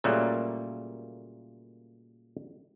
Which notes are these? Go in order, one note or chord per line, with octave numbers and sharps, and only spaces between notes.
A#2 C#3 F#3 G3 A3 A#3